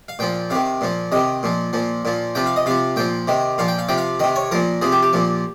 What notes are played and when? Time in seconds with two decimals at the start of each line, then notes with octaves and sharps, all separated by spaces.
0.08 F5
0.19 A#2 F3 G5
0.50 C3 D#3 F5
0.81 A#2 F3
1.12 C3 D#3 D#5
1.43 A#2 F3
1.73 A#2 F3
2.05 A#2 F3
2.35 C3 F3 G5
2.46 F5
2.56 D#5
2.66 C3 F3 F5
2.96 A#2 F3 G5
3.28 C3 D#3
3.58 A#2 F3 F5
3.68 G5
3.78 F5
3.88 C3 F3 G5
3.98 F5
4.20 C3 D#3 D#5
4.36 C#5
4.51 A#2 F3 A#4
4.82 C3 F3 G#4
4.92 G4
5.03 G4
5.13 A#2 F3